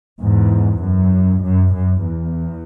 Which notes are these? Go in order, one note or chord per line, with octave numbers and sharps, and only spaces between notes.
E2 G#2
F#2
F#2
F#2
E2